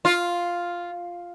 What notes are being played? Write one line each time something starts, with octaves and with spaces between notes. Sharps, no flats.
F4